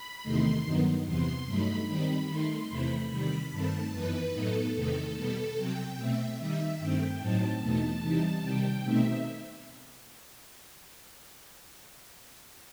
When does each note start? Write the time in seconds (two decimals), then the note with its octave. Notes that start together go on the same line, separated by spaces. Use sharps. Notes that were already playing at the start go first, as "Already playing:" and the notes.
Already playing: B5
0.23 E2 C3 D#3 A3 D#4 C6
0.65 G2 D#3 F#3 B3 D#4
1.06 E2 C3 E3 B3 C6
1.46 G2 F#3 A3 D#4 B5
1.88 D#3 G3 C4 D#4 B5
2.28 D#3 A3 D#4 C6
2.69 E2 C3 E3 A3 C4 B5
3.10 C3 D#3 G3 B5
3.51 G2 D#3 A3 C4 A5
3.92 F#2 E3 B3 D#4 B4
4.33 A2 F#3 B3 D#4 A4
4.74 E2 C3 D#3 A3 D#4 A4
5.15 B2 G3 B3 A4
5.56 C3 F#3 C4 G5
5.97 B2 A3 C4 E5
6.38 D#3 G3 D#4 E5
6.78 G2 D#3 A3 C4 G5
7.19 A2 F#3 C4 D#4 A5
7.61 E2 B2 A3 D#4
8.03 C3 E3 G3 D#4
8.43 C3 D#3 G3 G5
8.83 B2 A3 C4 D#4 E5